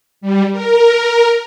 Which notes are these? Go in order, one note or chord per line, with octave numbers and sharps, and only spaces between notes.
G3
A#4